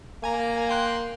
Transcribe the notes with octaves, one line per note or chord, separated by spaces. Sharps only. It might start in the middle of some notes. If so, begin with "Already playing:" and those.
A#3 G#5 A#5
G5 C6 F#6